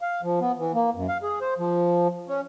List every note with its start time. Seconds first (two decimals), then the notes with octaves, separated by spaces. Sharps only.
0.01 F5
0.23 F3
0.41 B3
0.58 E3
0.74 A#3
0.95 F#2
1.08 F5
1.23 G#4
1.41 C5
1.58 F3
2.28 C#4